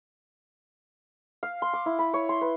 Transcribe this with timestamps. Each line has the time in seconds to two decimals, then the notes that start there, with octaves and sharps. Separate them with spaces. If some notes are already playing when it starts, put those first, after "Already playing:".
1.43 F5
1.62 C6
1.73 D6
1.86 E4
1.99 B5
2.13 C#5
2.29 C6
2.41 B4